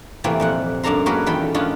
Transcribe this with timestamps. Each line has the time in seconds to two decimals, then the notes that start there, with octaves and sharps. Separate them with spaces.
0.24 C3 E3 A3 A#3 C4 F4
0.40 F2 A#2 F#5
0.83 F#2 A#3 D4 A4 A#5 C6
1.06 A#3 C#4 F#4 G#4 A4 B4
1.26 E2 A#2 D#3 A4 G5 B5
1.54 G#3 C#4 D4 F4 F#5